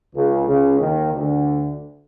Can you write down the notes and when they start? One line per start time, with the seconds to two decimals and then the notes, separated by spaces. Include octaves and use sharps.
0.16 C#2 C#3
0.48 C#2 C#3
0.80 D#2 D#3
1.13 D2 D3